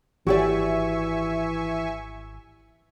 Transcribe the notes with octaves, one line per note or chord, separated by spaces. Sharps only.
G#1 E3 F#4 G4 D5 E5 G#5 C#6